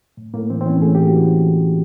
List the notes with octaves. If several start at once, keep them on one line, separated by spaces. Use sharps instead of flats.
A2
A2 A#3
E3 C4
C4
E3 C#4
A2 G#4
A2 G4
F#4
E3